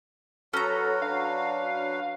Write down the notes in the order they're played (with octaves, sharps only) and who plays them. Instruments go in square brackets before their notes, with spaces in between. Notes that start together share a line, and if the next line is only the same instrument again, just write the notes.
[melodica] F#3 F#4 B4 [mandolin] C#4 A#5 [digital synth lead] A4
[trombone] D4 [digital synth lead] F5